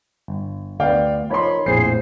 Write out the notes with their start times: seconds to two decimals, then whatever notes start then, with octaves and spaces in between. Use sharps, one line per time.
0.28 G1
0.80 D2 B3 D5 F5 G5
1.31 F3 D#4 A#4 C#5 B5 C6
1.66 A#1 F2 A2 G#4 C5 C7